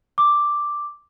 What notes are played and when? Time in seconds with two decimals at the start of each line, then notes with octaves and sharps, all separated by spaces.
0.18 D6